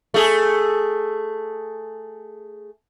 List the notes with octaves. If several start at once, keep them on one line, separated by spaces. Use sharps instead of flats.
A3 G#4